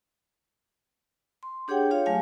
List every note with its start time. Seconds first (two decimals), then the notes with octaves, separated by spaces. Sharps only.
1.43 C6
1.68 D4 G4 G#4 C#5 F#5 G5
1.91 F4 G4 C#5 F5
2.06 F#3 A3 F5 G#5